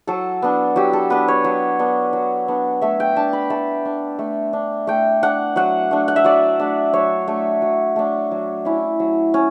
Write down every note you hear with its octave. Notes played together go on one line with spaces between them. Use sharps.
F#3 A4
B3 D4
F#3 G4
A4
B3 D4 B4
C#5
F#3
B3 D4
F#3
B3 D4
A3 E5
G5
D4 A5
B5
A3 A5
D4
A3
D4
A3 G5
D4 F#5
F#3 F#5
A3 D4
F#5
E5
F#3 D5
A3 D4
F#3 C#5
A3 D4
F#3
A3 D4
F#3
C#4 E4
F#3
C#4